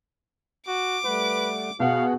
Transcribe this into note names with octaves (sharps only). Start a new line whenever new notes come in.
F#4 D6
G3 A3 B4 F#5
B2 B3 F#4 G#4 F5 F#5